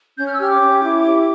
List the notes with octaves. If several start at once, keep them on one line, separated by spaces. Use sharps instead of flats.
C#4 G6
F6
E6
G4 F6
D6
C#4
E4
G4